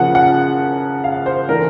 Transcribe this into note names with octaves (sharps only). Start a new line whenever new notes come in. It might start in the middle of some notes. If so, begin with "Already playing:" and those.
Already playing: C#3 F3 A#3 C#4 F#5
F#5
F5
C5
E3 A3 D4 A#4